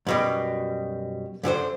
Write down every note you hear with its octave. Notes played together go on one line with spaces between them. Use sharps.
F#2 B2 G3
F#2 D3 G4 C5